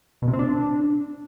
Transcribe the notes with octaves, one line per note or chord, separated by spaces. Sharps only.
B2
C3
C4
D4